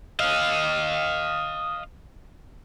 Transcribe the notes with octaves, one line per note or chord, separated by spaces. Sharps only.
D#5 F5